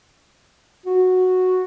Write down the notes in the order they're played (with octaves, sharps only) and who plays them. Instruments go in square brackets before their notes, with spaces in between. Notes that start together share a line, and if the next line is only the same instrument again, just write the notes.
[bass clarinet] F#4